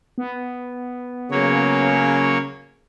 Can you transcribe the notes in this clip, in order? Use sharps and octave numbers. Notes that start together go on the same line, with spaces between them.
B3
C#3 F#3 A#3 C#5